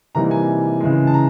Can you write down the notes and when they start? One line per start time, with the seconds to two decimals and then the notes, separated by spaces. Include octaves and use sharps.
0.15 C3 E3 G3 A#3 D#4 A#5
0.31 G#5
0.80 C#3 E3 G#3
1.07 A5
1.14 A#5